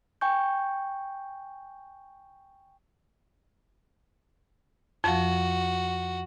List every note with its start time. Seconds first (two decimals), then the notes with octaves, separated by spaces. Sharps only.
0.21 G5 G#5 C#6 G6
5.04 F2 F3 F#4